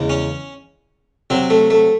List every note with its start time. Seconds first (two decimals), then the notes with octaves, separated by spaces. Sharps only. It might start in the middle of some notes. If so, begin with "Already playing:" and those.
Already playing: E2 C#3 G#3
0.10 C#4
1.30 C3 F#3 C4
1.50 A3
1.70 A3